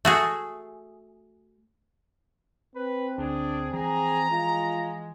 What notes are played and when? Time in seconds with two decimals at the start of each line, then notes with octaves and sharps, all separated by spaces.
0.05 A3 F#4 G#4
2.76 C4 B4
3.18 D2 D4 G#4
3.73 E3 F3 G#4 A#5
4.31 G#3 F4